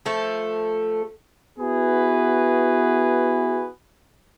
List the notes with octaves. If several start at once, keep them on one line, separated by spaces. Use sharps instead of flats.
F3 A3 A4
B3 E4 F#4 G#4 B4